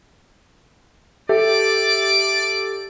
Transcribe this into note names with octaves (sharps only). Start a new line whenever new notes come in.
G4 A4 D5 E5 D6